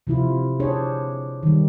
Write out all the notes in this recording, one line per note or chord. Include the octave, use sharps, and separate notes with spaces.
C3 F3 E4 F4
D4 G#4 C5 C#5
D#3 G3